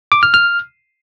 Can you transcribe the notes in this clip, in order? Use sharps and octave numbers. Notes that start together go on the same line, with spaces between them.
D6
F6
F6